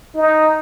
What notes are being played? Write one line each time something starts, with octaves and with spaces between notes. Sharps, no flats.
D#4